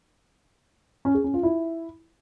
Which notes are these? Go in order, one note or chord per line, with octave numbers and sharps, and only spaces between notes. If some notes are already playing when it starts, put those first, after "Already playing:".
C#4
G#4
C#4
F4
E4